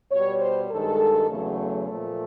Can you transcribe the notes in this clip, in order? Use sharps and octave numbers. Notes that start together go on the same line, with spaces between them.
B2 G3 C#5
C5
G2 D#3 G#3 A4
E2 C#3 F#3 A3
A4
A#2 F3 A3